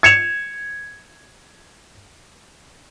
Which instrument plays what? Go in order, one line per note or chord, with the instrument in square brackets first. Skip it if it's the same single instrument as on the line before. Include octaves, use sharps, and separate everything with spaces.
[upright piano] G#6 C#7 E7 F7